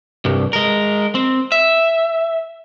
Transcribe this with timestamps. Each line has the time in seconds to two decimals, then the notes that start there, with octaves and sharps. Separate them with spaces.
0.25 C2 G2
0.53 G#3 A#4
1.15 C4
1.52 E5